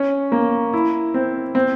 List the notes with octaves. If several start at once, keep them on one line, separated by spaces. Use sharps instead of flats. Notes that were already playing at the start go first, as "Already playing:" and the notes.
Already playing: C#4
A#3
E4
C4
C4